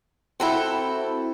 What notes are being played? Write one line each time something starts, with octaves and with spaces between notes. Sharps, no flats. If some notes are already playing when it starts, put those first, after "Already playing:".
C4 E4 F#4 A4 G5